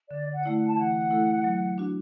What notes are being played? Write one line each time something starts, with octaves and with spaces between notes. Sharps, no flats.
D3 D5
F#5
A3 E4 D5
F#5
A5
E3 F#5
A3 E4 A4
F#3
D4 F#4